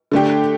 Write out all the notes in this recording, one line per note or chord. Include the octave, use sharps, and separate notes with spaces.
D3 A3 D4 G4